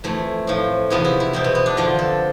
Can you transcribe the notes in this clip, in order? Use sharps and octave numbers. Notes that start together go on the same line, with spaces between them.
F2 E3 A3
A2 F3
E2 C3 F3 B3
E4
E4
E2 B2 C4
B3
B3
D4
F2 D3 F3 F4
A4